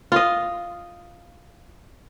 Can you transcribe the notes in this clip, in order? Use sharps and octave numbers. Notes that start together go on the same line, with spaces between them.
F4 D#5